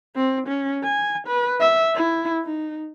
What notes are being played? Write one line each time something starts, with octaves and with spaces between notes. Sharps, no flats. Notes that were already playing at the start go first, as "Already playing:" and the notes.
C4
C#4
G#5
B4
E5
E4
D#4